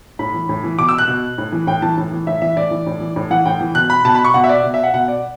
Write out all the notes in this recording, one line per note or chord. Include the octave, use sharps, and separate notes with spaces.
A2 B5
E3
A2
E3
B2 D6
E6
F#6
B2
A2
E3
A2 G5
E3 A5
A2
E3
A2 E5
E3 E5
A2 D5
E3
A2
E3
A2
E3 F#5
A2 G5
E3
B2 F#6
B5
B2 A5
B5
C#6
B2 F#5
E5
D5
B2
E5
F#5
B2 F#5
D5